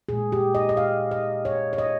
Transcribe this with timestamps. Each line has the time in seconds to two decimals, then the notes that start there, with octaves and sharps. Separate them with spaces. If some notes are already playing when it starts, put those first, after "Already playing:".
0.09 A#2 G#3 G#4
0.32 G4
0.55 D#5
0.69 D#5
0.77 F5
1.11 D#5
1.45 C#5
1.73 C#5
1.78 D#5